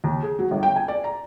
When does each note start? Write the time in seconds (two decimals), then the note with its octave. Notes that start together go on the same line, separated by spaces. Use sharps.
0.04 D#2
0.23 G#4
0.39 F#3
0.51 G1
0.63 G5
0.76 G#5
0.88 D5
1.04 A#5